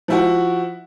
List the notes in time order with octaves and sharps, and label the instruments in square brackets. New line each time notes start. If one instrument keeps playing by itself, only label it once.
[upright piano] F3 E4 F#4